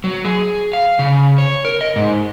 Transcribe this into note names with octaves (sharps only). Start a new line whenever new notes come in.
F#3
G#4
F5
C#3
C#5
A#4
D#5
G#2